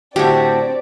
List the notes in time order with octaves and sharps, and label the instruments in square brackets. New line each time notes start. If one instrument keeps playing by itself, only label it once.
[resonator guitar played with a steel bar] A2 D3 F#4 [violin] C4 D5 [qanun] G4